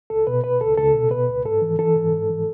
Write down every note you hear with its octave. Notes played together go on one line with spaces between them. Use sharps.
C#2 A4
B2 B4
B2 B4
C#2 A4
C#2 A4
B2
B2 B4
C#2
G#2 A4
E3
E3 A4
G#2
G#2
E3